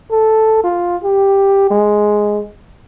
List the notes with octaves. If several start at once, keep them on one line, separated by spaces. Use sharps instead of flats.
A4
F4
G4
G#3